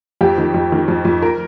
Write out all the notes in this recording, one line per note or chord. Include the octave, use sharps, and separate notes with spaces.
F2 G4
D#3
F2
D#3
F2
F2
A#4